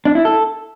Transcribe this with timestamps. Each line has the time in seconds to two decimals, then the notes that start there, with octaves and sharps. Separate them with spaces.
0.05 D4
0.15 E4
0.25 A4